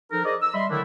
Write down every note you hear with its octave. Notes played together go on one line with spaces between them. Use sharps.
F3 D#4 A4 A#4
G#4 A#4 C5 D5 D#5
E6
G3 D#5 E5 B5 C6
D3 D#3 F#3 A3 D4 E4